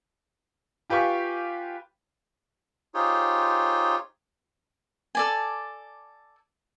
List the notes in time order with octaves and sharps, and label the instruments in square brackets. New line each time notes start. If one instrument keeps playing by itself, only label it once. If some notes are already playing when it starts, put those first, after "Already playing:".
[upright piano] F4 G4 B4 F5 G#5 C#6
[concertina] D#4 F4 G4 G#4 C5 C#5
[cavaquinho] A4 D5 G#5